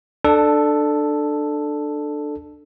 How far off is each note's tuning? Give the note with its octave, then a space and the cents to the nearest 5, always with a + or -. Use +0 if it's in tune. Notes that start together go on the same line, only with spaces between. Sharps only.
D4 +20 A4 +0